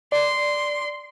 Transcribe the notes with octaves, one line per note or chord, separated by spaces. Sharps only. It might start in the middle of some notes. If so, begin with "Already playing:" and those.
D5 C6